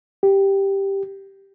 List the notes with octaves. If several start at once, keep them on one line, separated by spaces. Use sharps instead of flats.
G4